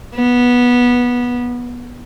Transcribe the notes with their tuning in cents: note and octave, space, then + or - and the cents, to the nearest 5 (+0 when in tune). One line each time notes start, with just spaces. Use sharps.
B3 -15